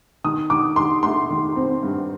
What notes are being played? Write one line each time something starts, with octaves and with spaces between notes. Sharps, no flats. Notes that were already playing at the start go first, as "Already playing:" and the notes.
D#3 D#6
D#3 D6
D#3 C6
A3 C6
D#3
C4
G2